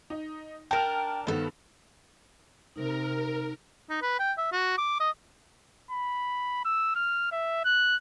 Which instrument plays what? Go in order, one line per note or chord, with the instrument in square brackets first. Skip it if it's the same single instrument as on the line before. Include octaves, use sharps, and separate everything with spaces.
[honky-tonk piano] D#4
[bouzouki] D4 A#4 [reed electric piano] G5 [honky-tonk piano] A5 F6
[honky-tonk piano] G2 D#3 B3 [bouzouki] A4 C5
[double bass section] C3 [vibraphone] D#4 [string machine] A#4
[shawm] D#4
B4
G5
E5
F#4
D6
D#5
[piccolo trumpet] B5
E6
F6
E5
F#6